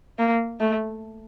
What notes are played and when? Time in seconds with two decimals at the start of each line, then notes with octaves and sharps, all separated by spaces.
0.19 A#3
0.60 A3